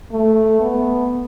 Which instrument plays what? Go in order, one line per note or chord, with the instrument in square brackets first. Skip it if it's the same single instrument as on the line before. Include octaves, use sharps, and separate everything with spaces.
[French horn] A3
B3